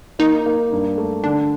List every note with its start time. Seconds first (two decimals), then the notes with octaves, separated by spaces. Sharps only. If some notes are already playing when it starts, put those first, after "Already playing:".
0.19 A#3 D#4
0.46 A#3
0.72 G2
0.98 A3
1.24 D3 D4